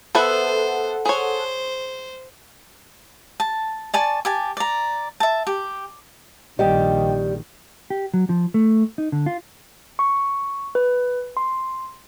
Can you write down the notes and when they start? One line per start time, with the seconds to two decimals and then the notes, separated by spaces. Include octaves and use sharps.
0.15 B3 A4 B4 C5 E5 F#5
1.05 G#4 C5 C#5
3.40 A5
3.94 D5 G#5 A5 C#6
4.25 G4 G#5 A5
4.57 D5 A#5
5.20 E5 A5
5.47 G4
6.59 A#1 D#3 G3 G4 D#5 G5
7.90 G4
8.14 F#3
8.29 F3
8.54 A3
8.98 D#4
9.12 D3
9.26 F4
9.99 C#6
10.75 B4
11.37 C6